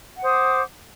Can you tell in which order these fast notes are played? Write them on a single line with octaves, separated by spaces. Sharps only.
F#5 C5 D#6 D6